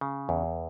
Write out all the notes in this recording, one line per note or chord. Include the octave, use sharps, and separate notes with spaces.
C#3
E2